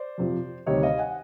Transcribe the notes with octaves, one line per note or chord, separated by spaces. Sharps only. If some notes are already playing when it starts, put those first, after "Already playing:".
Already playing: C5 D5
F2 C3 F3
D2 C3 D#3 G3 C#5 D#5
D#5 F5
F#5 G#5